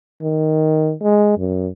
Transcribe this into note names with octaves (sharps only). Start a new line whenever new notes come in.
D#3
G#3
F#2